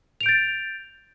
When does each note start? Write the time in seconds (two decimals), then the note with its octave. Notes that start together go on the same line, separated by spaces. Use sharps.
0.21 F7
0.23 D7
0.26 G6
0.29 A6